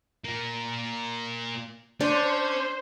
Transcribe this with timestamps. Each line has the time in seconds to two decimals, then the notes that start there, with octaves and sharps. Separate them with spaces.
0.24 A#2 A#3
2.01 C#4 D4 C5